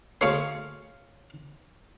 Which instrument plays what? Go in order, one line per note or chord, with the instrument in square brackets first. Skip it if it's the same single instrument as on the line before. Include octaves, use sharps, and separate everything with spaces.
[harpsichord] D2 G#4 C6 [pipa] C#5 F5